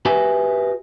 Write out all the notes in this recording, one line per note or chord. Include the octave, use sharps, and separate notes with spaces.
F#4 G4 B4 E5 G#5